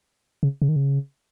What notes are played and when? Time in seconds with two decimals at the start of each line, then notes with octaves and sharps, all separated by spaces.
0.43 C#3
0.62 C#3
0.69 D#3
0.76 C#3